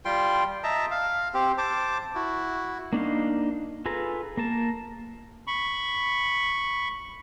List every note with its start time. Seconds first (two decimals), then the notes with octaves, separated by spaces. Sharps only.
0.05 G3 F4 G5 C6
0.63 D#5 E5 A5 A#5
0.91 F5
1.34 C4 G4
1.58 C5 A5 D6
2.15 E4 F#4
2.93 A#3 D4 D#4 F5
3.86 F4 G#4 A4 B4 A#5
4.37 A#3 A#4 A5
5.47 B5 C#6